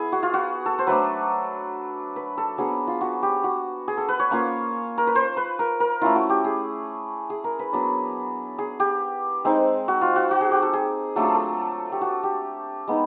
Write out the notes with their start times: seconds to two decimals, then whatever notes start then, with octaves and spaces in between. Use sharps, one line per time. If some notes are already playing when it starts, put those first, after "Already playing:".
Already playing: B3 E4 G#4
0.12 F#4
0.23 F4
0.34 F#4
0.66 A4
0.79 C5
0.87 F#3 A3 D4 B4
2.16 B4
2.38 A4
2.58 F#3 B3 D4 G#4
2.87 F4
3.01 F#4
3.23 G4
3.44 F#4
3.88 G#4
3.97 A4
4.09 B4
4.19 C#5
4.31 A#3 C#4 F4
4.98 A#4
5.07 B4
5.15 C5
5.37 B4
5.59 A#4
5.80 A#4
6.02 A3 C#4 E4 F4
6.15 F#4
6.30 G4
6.44 G#4
7.30 G#4
7.44 A#4
7.59 B4
7.73 F#3 B3 D4
8.58 G#4
8.80 G4
9.45 G#3 C4 D#4
9.88 F#4
10.01 F4
10.16 F#4
10.31 F#4
10.41 G#4
10.52 G4
10.62 A4
10.73 G#4
11.16 F#3 A3 D4 F4 A4
11.26 G#4
11.35 A4
11.92 G4
12.01 F#4
12.23 G4
12.88 G#3 B3 D#4